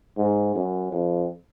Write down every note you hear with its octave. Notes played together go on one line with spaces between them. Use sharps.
G#2
F#2
F2